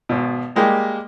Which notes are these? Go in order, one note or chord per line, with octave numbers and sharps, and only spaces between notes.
G#1 B2
G3 G#3 A#3 G4